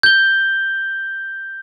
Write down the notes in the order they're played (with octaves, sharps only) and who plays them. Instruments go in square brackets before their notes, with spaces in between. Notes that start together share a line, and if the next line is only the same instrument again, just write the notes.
[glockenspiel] G6 G7